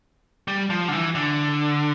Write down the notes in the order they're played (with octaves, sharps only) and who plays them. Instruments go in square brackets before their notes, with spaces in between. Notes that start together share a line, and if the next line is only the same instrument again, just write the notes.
[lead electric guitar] G3
F3
D3
E3
D3